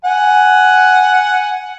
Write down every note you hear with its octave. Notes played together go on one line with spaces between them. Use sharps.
F#5 G#5